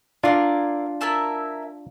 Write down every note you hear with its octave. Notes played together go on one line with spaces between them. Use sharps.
D4 E4 F4 A#4 D5 F5
E4 A#4 E5 A5